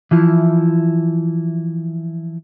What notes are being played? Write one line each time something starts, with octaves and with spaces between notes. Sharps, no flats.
E3 F3 E4